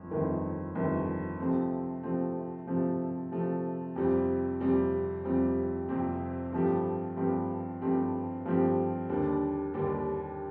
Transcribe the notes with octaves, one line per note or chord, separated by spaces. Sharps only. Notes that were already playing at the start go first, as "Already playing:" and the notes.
Already playing: G1 F2
G1 F2 D#3 A3
G1 F2 D#3 A3
C3 F3 A3 C4
C3 F3 A3 C4
C3 F3 A3 C4
C3 F3 A3 C4
F2 C3 G3 C4
F2 C3 G3 C4
F2 C3 G3 C4
F2 C3 G3 C4
G2 F3 A3 C4 G4
G2 F3 A3 C4 G4
G2 F3 A3 C4 G4
G2 F3 A3 C4 G4
D#2 D3 G3 D4
D#2 D3 G3 D4